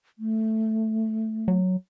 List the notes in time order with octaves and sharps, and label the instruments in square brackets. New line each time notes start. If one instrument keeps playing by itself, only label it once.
[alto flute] A3
[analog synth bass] F#3